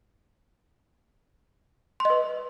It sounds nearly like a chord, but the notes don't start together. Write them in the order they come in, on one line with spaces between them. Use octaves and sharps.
C6 D#5 B4